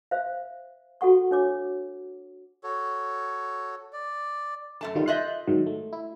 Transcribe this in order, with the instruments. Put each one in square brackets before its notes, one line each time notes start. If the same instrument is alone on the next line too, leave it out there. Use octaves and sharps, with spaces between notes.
[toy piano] C5 E5 F5
F#4 A4 F#5 C#6
D4 C#5 D6
[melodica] F#4 A4 C#5
D5
[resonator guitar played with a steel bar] F#2 A3 A5
[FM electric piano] D#3 G3 F4
[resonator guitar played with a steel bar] F4 D#5 E5 [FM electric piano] F#6 G6
[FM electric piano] G#2 D#3 F#3
A3
E4